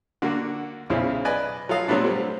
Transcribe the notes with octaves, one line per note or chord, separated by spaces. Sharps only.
D3 A#3 F#4
B1 C#3 E4 G#4 C5
B4 D5 D#5 G#5
F#3 F4 A4 F5 D#6
C3 F#3 A3 B3 D4
G3 A3 C4